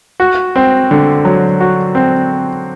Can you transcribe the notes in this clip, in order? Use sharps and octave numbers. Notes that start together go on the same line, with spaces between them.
F#4
C4
D3
F#3
F#4
C4